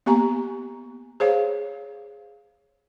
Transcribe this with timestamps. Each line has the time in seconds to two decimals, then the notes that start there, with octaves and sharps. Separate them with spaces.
0.06 A#3 B3 G4 G#5 A#5
1.20 G#4 C5 C#5 F5